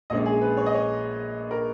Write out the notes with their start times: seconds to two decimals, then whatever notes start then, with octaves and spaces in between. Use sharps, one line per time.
0.10 A#1 A#2 G#3 C#4 D#5
0.26 G#4
0.41 B4
0.57 C#5
0.66 D#5
0.75 C#5
1.51 A#4